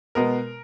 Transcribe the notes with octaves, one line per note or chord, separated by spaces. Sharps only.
B2 G#3 B3 A#4